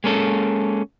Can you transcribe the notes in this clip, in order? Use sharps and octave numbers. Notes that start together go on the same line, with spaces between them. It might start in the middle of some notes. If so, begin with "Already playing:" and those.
G#3 A#3 C#4 A4